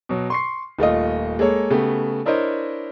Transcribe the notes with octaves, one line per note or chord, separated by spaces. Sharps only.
B2 F#3
C6 C#6 C7
D#1 A3 F4 D#5
G#3 A#3 A4 C#5
C#3 A3 B3 G4
D4 E4 A#4 C5 C#5 D#5